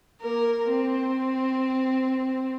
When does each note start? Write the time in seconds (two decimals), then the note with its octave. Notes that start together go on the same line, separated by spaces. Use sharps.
0.21 A#3 A#4
0.69 C4